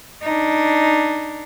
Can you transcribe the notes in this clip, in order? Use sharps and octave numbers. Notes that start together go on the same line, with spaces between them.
D4 D#4